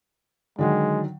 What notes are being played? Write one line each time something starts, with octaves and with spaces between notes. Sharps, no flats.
D3 D#3 F#3 G#3